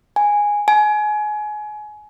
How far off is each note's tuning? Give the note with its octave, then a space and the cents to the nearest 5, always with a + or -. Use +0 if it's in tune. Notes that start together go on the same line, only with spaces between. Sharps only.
G#5 -5
G#5 +25